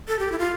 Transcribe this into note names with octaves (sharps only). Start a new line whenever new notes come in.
A4
G4
E4
F4